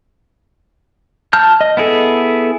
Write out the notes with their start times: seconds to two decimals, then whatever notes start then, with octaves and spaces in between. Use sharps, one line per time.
1.33 A5 F6 G6
1.61 D#5
1.77 B3 E4 G#4 A4